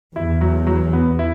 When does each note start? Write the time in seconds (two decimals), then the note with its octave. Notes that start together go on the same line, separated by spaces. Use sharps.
0.16 E2 E4
0.41 F#3
0.67 F#3
0.93 B3
1.19 E4